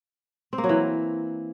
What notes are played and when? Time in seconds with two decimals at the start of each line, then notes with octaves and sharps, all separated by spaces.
0.53 C4
0.58 A#3
0.64 F#3
0.69 E3